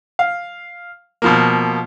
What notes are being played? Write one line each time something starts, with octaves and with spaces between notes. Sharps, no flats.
F5
B2 F3 A#3